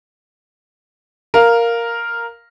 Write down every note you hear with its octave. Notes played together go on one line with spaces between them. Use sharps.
A#4 F5